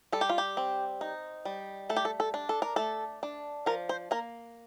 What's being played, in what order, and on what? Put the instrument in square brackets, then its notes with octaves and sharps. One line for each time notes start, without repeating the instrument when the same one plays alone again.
[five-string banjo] G3 A4
G4
F4
G4
C4
D#4
G3
A3 A4
G4
A4
A4
D4
A4
A#4
A3 A4
D4
F3 A#4
C5
A#3 A#4